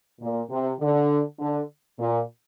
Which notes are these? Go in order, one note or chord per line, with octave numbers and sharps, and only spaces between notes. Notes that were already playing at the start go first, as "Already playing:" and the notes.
A#2
C3
D3
D3
A#2